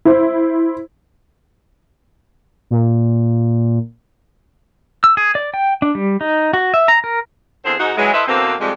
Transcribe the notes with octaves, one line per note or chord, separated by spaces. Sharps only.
E4 C5
A#2
E6
G#4
D5
G5
D4
G3
D#4
F#4
E5
A#5
A#4
E2 D3 C4 G#4 C5
G#2 D#4 F#4
E3 F#3 G#3
E4 A4 B4 C5 D#5 E5
B2 D3 E3 A#3 C4
F2 G3 G#3